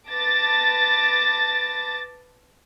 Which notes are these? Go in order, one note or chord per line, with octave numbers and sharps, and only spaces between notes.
B4 A5 D6 A6 A#6